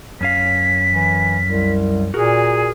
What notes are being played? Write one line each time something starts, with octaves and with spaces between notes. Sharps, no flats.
F#2 C#4 F5 B6
E3
C2
A#2 F#4 G#4 A#4